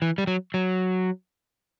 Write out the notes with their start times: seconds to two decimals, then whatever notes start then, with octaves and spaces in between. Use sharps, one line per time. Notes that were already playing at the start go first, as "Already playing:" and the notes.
0.02 E3
0.18 G3
0.27 F#3
0.54 F#3